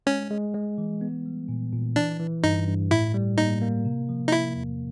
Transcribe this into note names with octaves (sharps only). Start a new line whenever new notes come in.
G#3 C#4
G#3
G#3
E3
B3
G3
A#2
A#2
E3 D4
E3
G2 D#4
G2
A2 E4
G3
A#3 D#4
A#3
C3
F3
D#4
C3 E4
E2